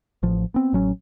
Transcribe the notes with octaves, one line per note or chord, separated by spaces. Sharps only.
A1 F3
B3 C4
A1 F#3 C#4